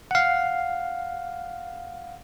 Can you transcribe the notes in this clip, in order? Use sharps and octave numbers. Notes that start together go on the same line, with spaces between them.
F5 F#5